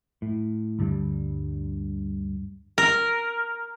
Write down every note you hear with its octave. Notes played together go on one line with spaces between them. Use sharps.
A2
D2 G2 D3 G3
A#4